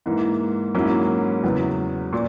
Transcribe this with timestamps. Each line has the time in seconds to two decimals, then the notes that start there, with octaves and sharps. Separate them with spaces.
0.06 G#2 E3 A#3
0.75 G#2 F#3 A#3 C#4 E4
1.43 E2 C#3 F#3 B3
2.13 A#2